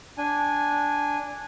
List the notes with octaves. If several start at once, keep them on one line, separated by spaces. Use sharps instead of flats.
D4 G#5